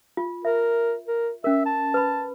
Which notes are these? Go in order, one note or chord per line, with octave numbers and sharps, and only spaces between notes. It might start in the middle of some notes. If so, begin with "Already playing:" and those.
F4
A#4 E5
A#4
C#4 A#4 E5
A5
B4 B5